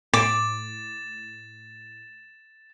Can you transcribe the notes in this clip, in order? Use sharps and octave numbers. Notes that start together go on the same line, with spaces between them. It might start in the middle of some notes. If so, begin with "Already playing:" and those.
A2 D6 A6 E7